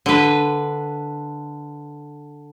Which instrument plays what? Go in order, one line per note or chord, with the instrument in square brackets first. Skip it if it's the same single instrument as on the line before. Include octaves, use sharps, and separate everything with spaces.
[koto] D3 B4